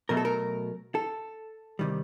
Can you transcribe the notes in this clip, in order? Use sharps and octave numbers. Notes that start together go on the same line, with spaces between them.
B2 F#3 A3 A#4
A4
A#4
A4
C3 D#3 G3